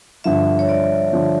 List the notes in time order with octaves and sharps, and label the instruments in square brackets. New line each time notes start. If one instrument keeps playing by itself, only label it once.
[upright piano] G2 D3 F3 [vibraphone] E5
[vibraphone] C#5
D5
[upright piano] D3 F3